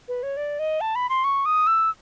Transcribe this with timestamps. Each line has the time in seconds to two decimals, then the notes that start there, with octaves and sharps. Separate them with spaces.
0.08 B4
0.23 C#5
0.37 D5
0.59 D#5
0.81 A5
0.95 B5
1.09 C6
1.24 C#6
1.45 D#6
1.67 E6